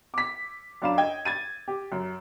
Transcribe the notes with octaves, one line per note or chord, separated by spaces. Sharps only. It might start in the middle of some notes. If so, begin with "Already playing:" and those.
D6 B6
F#2 D4 F5 B5 E7
D#5 G5 G#6
G#6 A6 D#7
G4
F#2